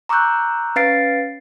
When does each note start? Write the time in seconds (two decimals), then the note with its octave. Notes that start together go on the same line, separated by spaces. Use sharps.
0.09 A#5 C#6 D6 E6 F#6 G6
0.76 C#4 B4 F5 A6 C7 D7